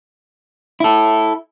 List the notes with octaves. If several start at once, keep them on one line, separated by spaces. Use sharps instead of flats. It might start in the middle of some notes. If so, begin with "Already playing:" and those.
E4 A4